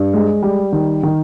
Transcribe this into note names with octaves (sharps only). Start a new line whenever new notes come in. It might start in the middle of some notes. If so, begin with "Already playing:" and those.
Already playing: G2
G#3
G3
D#3
D#3